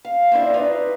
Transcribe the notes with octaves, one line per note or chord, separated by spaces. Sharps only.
F5
C4 D4 E4 D5
D#4 B4